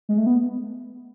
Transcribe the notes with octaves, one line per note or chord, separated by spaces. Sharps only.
G#3
A3
B3